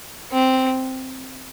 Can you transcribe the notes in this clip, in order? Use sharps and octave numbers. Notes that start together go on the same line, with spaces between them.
C4